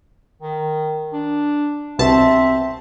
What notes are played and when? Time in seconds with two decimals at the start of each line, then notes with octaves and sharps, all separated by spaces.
0.42 D#3
1.13 D4
1.99 C2 B2 C4 E5 A5